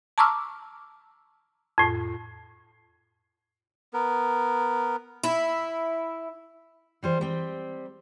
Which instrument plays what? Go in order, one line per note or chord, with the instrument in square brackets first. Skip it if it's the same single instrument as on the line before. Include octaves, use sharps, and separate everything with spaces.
[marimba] A5 A#5 C#6 D6 E6 F6
F2 A2
[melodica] B3 A#4
[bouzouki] E4
[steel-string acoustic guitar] E3 G3 C5
G3 C4